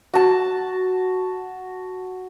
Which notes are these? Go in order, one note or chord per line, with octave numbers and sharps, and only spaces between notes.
F#4 A5